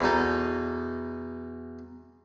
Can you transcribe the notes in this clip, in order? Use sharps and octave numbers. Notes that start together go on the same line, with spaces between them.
E2 B2 D#4 A4